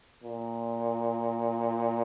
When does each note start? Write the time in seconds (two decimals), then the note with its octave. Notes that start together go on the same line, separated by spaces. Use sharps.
0.24 A#2